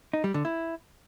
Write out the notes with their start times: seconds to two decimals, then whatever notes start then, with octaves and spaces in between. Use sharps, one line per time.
0.13 D#4
0.24 G3
0.34 D3
0.45 E4